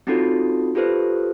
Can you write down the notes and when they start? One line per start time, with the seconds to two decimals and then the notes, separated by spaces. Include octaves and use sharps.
0.07 C4 C#4 D#4 F4 F#4 A4
0.75 F4 G4 A4 B4 C5